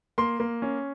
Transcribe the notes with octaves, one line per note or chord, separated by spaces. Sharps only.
A#3 C6
A#3
C#4